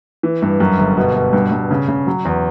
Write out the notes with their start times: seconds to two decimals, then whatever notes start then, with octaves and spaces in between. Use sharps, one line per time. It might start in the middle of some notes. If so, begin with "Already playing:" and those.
0.23 E3
0.42 G2
0.60 F#2
0.79 G1
0.97 B2
1.15 B2
1.33 G2
1.52 G2
1.71 C#3
1.88 C#3
2.07 F#3
2.25 E2